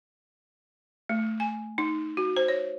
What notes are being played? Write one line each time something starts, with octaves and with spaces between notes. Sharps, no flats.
A3
G#5
D#4
F#4
C5
C#5